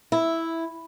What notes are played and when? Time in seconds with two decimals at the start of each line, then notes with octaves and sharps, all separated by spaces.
0.12 E4